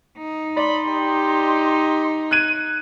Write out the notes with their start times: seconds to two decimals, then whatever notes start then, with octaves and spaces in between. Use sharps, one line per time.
0.17 D#4
0.57 D5 B5 C6
0.86 G4
2.31 F#6 G#6 D#7